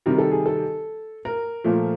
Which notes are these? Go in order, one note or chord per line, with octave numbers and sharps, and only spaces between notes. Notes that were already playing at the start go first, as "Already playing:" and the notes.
C3 D#3 G3 A#4
A4
G#4
A4
A#4
A#2 F3 A3